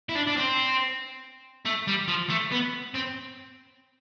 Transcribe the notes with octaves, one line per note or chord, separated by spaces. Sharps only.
E4
D4
D4
C4
A3
G3
F3
A3
B3
C4